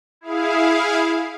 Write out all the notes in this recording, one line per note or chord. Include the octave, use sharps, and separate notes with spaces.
E4 G#4 F5